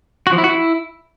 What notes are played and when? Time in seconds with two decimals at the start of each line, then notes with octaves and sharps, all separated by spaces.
0.27 F#4
0.32 F3
0.38 E4
0.44 F#4
0.50 E4